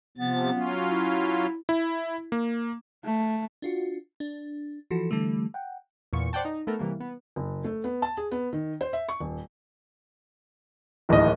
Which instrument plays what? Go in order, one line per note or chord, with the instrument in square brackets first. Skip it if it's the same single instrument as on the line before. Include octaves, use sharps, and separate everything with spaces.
[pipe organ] C3 F3 A6 [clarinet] B3
[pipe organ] F#3 C#4 F4
[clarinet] E4
[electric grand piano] E4
A#3
[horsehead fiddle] A3
[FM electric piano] D4 F4 F#4
D4
E3 F3 F#4 A4
D3 E3 G3 A3
F#5 G5
[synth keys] E2 A#2 C#6 C#7
C5 D5 F#5 G5 A5
D#4
A3 B3 A4 A#4
C3 E3 G3 A#3
B3
[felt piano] F#1
A3
B3
A5
G#4
B3
D#3
C5
E5
C#6
D#1
[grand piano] D1 D#5 [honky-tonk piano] D#2 E3